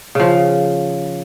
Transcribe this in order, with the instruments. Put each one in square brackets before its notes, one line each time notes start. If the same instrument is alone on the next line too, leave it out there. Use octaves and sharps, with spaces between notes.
[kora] C#3 F3